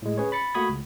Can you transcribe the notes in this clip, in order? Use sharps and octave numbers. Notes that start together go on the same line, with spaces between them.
A2 G#3
C#4 G#4 B4 C#5
B5 A6 C#7
A3 A#3 F#4 B5 D#6 G#6
C#2